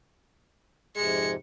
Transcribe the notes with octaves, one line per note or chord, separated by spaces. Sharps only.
F2 G#2 C3 G#3 C#7